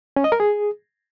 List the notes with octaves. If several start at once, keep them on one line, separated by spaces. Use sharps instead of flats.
C#4
D#5
A#4
G#4